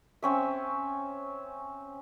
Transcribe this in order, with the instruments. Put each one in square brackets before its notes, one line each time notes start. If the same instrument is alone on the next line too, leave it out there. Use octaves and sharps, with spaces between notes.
[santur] C4 C#4 E5